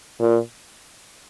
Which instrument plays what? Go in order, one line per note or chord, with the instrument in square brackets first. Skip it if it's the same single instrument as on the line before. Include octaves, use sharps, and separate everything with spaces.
[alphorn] A#2